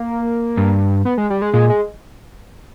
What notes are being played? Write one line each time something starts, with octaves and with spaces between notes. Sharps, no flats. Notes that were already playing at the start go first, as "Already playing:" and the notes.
Already playing: A#3
G2
B3
G#3
G3
G#3
A#2 G#3
G#3